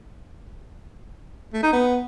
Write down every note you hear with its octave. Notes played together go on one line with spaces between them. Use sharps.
A3
D#4
B3